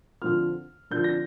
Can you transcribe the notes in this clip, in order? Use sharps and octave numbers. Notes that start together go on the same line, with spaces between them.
D3 F3 C4 F4 F6
D3 F3 D4 F4 G6
A#6